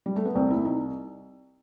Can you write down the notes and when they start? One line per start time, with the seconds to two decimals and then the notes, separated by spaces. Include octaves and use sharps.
0.06 G3
0.16 A3
0.25 B3
0.35 C2 C4
0.50 E4
0.56 C2
0.65 D#4